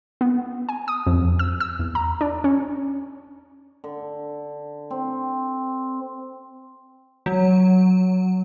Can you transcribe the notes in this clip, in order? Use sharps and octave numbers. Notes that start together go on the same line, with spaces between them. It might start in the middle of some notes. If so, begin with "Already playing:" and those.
B3
G#5
D#6
F2
E6
E6
E2
A#5
D4
C#4
D3
C4
F#3